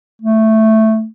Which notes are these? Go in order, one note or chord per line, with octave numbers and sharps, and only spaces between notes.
A3